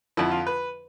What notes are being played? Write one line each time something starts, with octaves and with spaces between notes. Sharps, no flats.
F2 D3 F3 E4
F4
B4